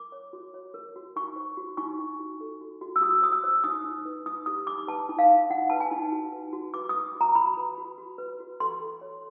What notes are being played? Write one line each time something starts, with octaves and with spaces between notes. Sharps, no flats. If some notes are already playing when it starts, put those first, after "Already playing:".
Already playing: A#4 D6
C#5
F#4
C#5
A#4
F#4
D#4 C#6
C5
F#4
D#4 C#6
D#4
F#4
A4
F#4
F#4
E6
F#4 D#6
C5 D#6
E6
C5
D#4 D#6
D#4
B4
D#4 D#6
G4 D#6
D#4 D6
B4 A5
D#4
F5
D#4
D#4 F#5
B4 A5
G#5
D#4
F#4
B4
F#4
B4 D6
D#6
B4
F#4
A#5
F#4 B5
B4
F#4
F#4
B4
F#4
A4 C6
A4
C#5